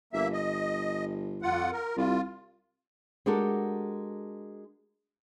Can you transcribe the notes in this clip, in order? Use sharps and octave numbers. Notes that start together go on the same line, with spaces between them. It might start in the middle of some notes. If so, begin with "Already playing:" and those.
G1 A#3 E5
D#5
F2 F4 F#5
A#4
C2 F4
G#3 D4 F#4 G4 A4 A#4